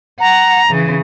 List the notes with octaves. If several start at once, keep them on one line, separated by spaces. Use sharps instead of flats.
F#5 A#5
C#3 E3